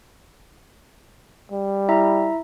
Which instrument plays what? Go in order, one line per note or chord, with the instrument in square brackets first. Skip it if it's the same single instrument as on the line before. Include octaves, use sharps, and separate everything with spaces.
[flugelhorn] G3
[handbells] E4 E5 A#5